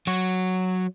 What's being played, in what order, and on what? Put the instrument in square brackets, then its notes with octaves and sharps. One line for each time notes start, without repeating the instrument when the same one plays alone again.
[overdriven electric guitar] F#3 F#4